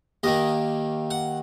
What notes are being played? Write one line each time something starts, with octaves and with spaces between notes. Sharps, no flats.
D#2 D#3 A#3 D#5
F#5